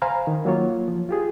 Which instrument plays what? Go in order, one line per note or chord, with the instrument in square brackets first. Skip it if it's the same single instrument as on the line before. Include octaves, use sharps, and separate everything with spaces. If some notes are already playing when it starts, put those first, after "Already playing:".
[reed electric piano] C5 F5 G#5 A#5 B5
D#3
F#3 A#3 F4 C#5
F3
F4 G4 G#4